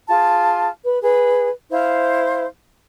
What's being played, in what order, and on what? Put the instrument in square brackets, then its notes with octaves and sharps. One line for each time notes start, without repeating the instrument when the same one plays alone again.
[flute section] F4 G#4 A5
B4
G#4 B4
E4 C5 F5